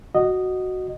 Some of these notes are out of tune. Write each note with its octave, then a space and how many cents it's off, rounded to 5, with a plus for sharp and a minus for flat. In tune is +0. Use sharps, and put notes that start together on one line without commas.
F#4 +0 D#5 -10